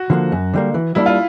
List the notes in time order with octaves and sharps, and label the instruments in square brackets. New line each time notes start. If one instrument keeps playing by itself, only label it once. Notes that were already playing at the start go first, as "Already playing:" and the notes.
Already playing: [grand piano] F#4
[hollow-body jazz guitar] D3 F3 A#3
F#2
D3 G3 A#3
E3
[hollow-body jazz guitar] G3 A#3 D4 [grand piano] E4
[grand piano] F4